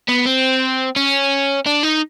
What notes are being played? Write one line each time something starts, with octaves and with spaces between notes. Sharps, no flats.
B3
C4
C#4
D4
D#4